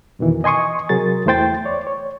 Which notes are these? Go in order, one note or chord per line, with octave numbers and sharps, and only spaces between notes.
F2 B2 D#3 E3
D#5 G#5 C6 C#6 D#6
C3 F#3 G#4 A#4 A6
E2 A3 E4 C5 G5 A6
C#5 D5
C#5